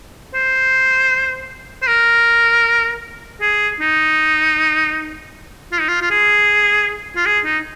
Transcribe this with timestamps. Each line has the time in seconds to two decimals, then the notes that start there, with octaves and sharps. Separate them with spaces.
0.34 C5
1.82 C5
1.87 A#4
3.42 G#4
3.80 D#4
5.72 F4
5.80 D#4
5.88 F4
6.01 F4
6.11 G#4
7.16 F4
7.26 G#4
7.45 D#4